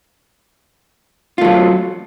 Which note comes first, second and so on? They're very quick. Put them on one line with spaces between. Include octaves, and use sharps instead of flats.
F4 A3 F#3